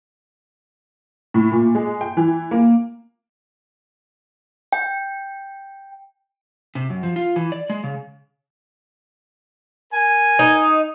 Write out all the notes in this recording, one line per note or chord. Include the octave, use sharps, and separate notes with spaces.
A2
A#2
G#3
G5
E3
A#3
G5
C3
F#2
F3
F4
E3
D5
G#3
C#3
A#4 G#5
D#4